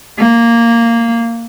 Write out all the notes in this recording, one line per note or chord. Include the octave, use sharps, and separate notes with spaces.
A#3